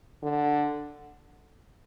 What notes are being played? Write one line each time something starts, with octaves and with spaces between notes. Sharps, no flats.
D3